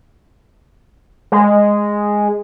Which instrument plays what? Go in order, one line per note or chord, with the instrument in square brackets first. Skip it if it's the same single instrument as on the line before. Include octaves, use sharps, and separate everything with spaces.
[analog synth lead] G#3